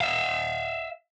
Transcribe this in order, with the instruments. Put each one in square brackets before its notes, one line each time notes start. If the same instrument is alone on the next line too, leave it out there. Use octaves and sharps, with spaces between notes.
[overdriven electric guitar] E5 F5